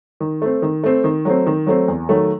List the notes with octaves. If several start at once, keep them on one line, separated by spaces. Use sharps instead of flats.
D#3
A3 C4
D#3
A3 C4
D#3
F#3 A3 C4
D#3
F#3 A3 C4
E2
D#3 F#3 A3